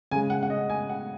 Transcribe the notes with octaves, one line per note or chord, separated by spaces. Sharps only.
C#3 G#3 G#5
F#5
F#5
D#5
G#5
F#5